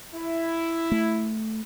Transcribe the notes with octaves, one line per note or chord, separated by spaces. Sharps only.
E4
A3